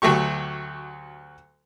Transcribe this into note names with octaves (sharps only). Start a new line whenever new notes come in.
D2 F#3 A3 G4 C#6